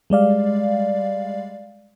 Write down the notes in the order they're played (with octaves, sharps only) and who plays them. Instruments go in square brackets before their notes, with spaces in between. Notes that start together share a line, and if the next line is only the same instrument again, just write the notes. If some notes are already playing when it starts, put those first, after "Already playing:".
[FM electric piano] G3 G#3 D5 F5